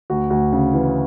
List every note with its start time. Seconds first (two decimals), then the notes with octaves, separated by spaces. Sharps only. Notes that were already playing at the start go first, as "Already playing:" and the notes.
0.10 D2 F#4
0.30 D2 F#4
0.53 C#3
0.74 E3